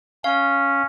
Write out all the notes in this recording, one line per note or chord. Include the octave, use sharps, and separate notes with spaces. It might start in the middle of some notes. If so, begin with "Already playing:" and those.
C#4 F5